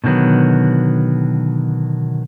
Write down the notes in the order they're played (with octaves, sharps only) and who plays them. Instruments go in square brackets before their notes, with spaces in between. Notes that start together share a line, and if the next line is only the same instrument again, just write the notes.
[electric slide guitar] B2 D3 D#3 F#3 B3